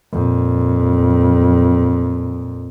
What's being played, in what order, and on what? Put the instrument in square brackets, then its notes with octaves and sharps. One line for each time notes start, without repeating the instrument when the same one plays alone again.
[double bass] F2 A#2